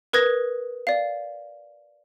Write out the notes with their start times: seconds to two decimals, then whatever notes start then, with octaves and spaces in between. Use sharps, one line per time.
0.13 A#4 B4 D#6 G#6 A#6
0.87 D5 F5